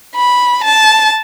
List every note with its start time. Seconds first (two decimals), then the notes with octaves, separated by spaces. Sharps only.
0.16 B5
0.64 A5